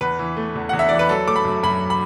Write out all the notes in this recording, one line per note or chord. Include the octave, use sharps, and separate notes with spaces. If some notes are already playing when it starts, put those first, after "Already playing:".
E2 B4
E3
A3
E2
E2 F#5
E5
E3 D5
B4
F#3 A4
A3 D6
B5
F#2
F#2 B5
B5